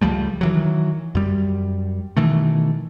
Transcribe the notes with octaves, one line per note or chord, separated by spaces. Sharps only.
C#2 F3 G3 A3
D#3 E3 F#3
F#2 G3
B2 D#3 E3 A3